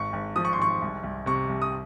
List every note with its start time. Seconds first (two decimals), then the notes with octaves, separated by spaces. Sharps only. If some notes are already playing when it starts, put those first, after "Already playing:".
Already playing: G#1 C#6
0.13 G#1
0.36 F3 D#6
0.45 C#6
0.53 C6
0.58 G#1 C#6
0.82 C2
1.04 C2
1.26 C3 C#6
1.49 C2
1.62 D#6